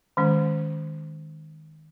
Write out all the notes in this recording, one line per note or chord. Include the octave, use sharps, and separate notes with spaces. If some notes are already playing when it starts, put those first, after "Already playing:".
D#3 G#3 C#4